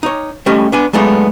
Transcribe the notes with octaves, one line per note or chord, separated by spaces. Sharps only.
D#4 C#5
G3 A3 C#4 G4 D#5
B3 D4 G#5
F#3 G#3 A3 B3 D#4 D5